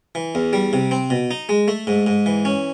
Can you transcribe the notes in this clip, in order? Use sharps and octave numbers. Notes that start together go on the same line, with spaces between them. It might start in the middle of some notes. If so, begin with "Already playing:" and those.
E3
E2
G3
C3
C4
B2
D#4
G#3
A3
G#2
G#2
E3
C#4